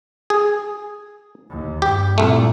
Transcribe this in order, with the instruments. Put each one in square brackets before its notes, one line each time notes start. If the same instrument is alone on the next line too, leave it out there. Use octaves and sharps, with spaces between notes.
[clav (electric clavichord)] G#4
[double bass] D#2
[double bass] G2 [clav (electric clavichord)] G4
[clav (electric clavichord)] C2 A3 [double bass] A#2